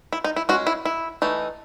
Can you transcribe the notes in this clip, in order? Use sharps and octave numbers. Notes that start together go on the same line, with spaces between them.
E4
D#4
E4
G#3 C#4 F#4
E4
E4
E3 A3 D#4